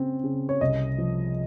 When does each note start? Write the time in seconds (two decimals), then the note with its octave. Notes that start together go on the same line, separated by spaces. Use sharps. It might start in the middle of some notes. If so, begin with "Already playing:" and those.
Already playing: C#3 C4
0.24 C#3
0.49 C#5
0.61 C2 D#5
0.98 F3